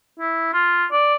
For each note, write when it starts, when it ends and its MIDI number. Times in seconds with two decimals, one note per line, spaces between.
0.19 0.52 64
0.53 0.85 65
0.92 1.15 74